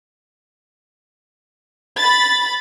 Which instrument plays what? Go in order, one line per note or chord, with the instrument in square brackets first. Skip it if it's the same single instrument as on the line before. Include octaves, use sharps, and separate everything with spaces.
[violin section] B5 A6